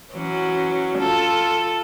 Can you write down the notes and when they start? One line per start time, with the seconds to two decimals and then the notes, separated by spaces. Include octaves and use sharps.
0.12 E3 F#3 C#4
0.99 F4 A4